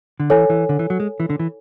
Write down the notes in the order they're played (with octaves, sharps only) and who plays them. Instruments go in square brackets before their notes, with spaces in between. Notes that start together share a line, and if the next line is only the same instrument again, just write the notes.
[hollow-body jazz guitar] D3
[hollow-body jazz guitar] E3 [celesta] A4 C#5 G#5
[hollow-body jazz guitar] E3
D3
E3
F#3
G#3
E3
D3
E3